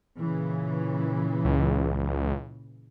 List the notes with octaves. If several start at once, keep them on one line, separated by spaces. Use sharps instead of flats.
A#2 C#3 E3
C#2